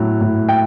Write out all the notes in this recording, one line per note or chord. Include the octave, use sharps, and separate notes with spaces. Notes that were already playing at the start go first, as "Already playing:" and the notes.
Already playing: A2 F#3
A2
G5